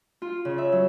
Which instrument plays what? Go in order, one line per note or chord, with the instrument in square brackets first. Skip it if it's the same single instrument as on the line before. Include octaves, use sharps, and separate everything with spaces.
[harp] F4
C#3
E5
F#3